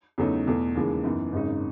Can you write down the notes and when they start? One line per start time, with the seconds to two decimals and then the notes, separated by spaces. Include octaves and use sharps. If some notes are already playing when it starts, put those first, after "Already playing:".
0.18 E2 C#3 F#3 A3 D#4
0.47 E2 B2 A3
0.75 D#2 C#3 E3 G#3
1.03 F#2 E3 B3 D#4
1.32 G#1 F#2 C#3 G#3 D#4